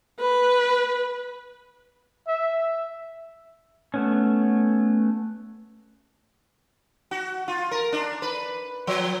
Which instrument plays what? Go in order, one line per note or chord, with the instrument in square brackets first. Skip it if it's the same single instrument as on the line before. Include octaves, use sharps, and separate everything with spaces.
[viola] B4
[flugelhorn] E5
[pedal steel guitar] A3 B3 C#4
[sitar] F#4
F4
A#4
D4
B4
F3